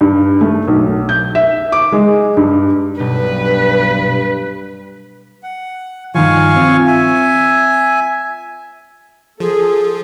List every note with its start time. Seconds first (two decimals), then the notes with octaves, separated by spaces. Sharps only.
0.01 G2
0.41 A3
0.68 B1
1.09 G6
1.35 E5
1.72 D6
1.92 G#3
2.37 G2
3.00 B1 G2 B4
5.43 F#5
6.15 G2 D#3 F3 F5 G#5 C#6
6.56 C4 F4
6.87 E5 G#5
9.40 F3 G#4 A4